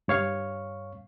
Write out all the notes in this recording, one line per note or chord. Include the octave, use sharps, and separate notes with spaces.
G2 C#5 F5 C#6